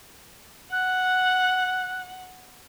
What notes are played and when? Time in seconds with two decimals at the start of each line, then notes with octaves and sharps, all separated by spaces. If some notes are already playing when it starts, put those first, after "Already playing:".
0.72 F#5 F#6